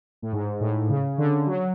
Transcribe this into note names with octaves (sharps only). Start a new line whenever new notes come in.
A2
G#2
A2
C#3
D3
F#3